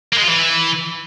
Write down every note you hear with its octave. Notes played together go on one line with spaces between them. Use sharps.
A#3
G#3
F4
E3